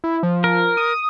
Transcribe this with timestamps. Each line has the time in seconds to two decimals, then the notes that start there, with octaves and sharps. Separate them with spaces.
0.04 E4
0.23 F3
0.44 A#4
0.77 D#6